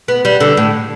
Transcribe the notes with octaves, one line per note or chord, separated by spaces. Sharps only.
B3
G3
D3
A2